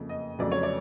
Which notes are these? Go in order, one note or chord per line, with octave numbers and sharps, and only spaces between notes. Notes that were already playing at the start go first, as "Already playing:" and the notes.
Already playing: F#1 F2 C#3
D#5
F1 F2 C#3 F#3 D5
C#5
D5